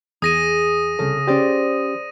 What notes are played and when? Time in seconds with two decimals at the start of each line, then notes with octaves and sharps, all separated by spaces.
0.22 E2 G#4 D#6 A#6 D#7
0.99 C2 C#3 A4
1.28 C#4 G4 C5 D5